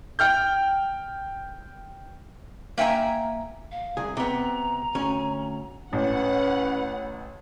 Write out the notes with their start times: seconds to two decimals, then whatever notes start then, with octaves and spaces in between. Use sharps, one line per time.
0.19 G5 F6 G6
2.78 A#3 E5 G5 G#5 A#5
3.72 F5
3.97 C2 G#4
4.17 C3 B3 A#5
4.95 D2 C#4
5.93 A1 C#4 B4 F#5